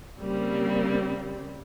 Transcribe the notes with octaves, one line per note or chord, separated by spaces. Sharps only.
C#3 G3 A#3 C4